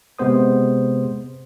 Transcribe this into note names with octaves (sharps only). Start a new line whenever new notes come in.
C3 G#3 B3 C5 D#6